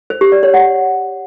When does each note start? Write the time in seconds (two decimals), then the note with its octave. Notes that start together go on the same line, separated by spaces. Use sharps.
0.10 C5
0.21 G4
0.32 D5
0.43 C#5
0.54 F#5